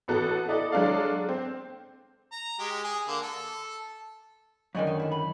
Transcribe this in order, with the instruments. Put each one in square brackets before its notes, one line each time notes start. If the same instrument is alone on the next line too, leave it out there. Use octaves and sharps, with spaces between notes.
[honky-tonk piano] A1 B3 F#4 A4
E4 A4 D5 D#5
F#3 G#3 D4 A4 D5 F5
C4
[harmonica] A#5
G#3 G4
G#4
D3 A#3
A4
[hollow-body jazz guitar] F#2 D3 D#3 [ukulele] D5 D#5 G#5
[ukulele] F#4 G#5
E4 A4
B5